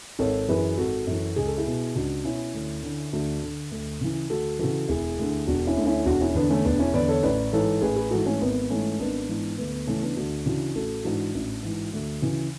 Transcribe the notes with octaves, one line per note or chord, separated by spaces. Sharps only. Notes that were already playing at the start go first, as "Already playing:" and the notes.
G#1 A4 C#5
F#2 E3 G#4 B4
G#1 F#4 A4
F#2 E3
C#2 G#4
A4
E4 G#4
B2
C#2 D4 F#4
B2 C#4 E4
D2
D3
D2 D4 F#4
D3
D2
C#3 E3
D2 F#4 A4
C#3 E3 F#4 A4
E1 E4 G#4
D2 D3
E1 D4 F#4
C#4 E4
D2 D3
C#4 E4
E1 D4 F#4
C#4 E4
E2 D3 B3 D4
A3 C#4
E1 B3 D4
C#4 E4
E2 D3 B4 D5
A4 C#5
A1 B4 D5
G#2 E3 A4 C#5
A1 G#4 B4
G#4 B4
G#2 E3 F#4 A4
A3 C#4
G#1 B3
G#2 E3 A3 C#4
G#1 B3 D4
G#2 E3
D2 B3
B3
C#3 E3 A3 C#4
B3 D4
D2 D4 F#4
C#3 E3 D4 F#4
A1 F#4 A4
G#2 E3 D4 F#4
A1
G#2 E3
D2
C#3 E3